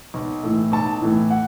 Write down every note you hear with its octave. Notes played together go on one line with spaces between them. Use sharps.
B1
A2 E3 A3
B1 A5
A2 E3 A3
F#5